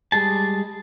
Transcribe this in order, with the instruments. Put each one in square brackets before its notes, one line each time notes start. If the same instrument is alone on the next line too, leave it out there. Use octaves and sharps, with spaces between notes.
[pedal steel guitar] G3 G#3 G#4 A5